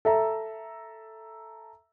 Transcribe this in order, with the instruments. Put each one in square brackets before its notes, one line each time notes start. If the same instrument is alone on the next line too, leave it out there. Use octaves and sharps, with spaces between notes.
[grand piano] A4 E5 A#5